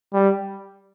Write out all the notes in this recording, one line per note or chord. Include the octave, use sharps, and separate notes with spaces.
G3